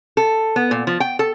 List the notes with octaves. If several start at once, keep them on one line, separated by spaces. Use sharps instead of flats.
A4
B3
A#2
F3
G5
A4